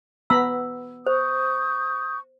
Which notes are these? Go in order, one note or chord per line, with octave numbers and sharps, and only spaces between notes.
B3 A#5 B5 E6
C5 C#6 D#6 G6